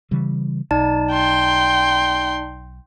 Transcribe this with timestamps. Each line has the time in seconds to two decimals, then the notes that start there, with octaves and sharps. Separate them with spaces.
0.11 C#3 E3 G3
0.71 B1 D#4 D5 A5
1.12 G5 C6